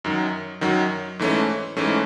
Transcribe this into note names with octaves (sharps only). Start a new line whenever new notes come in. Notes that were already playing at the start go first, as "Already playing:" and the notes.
F#2 D#3 F#3
F#2 D#3 F#3
G#2 E3 A3 C#4
G#2 E3 A3 C#4